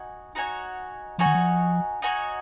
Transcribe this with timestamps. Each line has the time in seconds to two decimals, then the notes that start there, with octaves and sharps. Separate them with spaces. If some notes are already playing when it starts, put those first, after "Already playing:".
Already playing: D#4 F#4 G#5
0.35 D#4 F#4 C#5 G#5
1.18 F3 D#4 F#4 C#5 G#5
1.26 D#3
1.35 F3
2.02 D#4 F#4 C#5 G#5